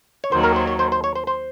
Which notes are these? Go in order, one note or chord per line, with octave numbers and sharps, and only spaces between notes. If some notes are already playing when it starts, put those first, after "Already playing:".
C#5
D#2 D#3 F#3 C5
A#4
C5
C#5
C5
C5
C#5
C5
C5